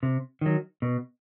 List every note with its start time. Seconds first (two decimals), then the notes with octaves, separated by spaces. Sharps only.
0.03 C3
0.41 D#3 F#3
0.82 B2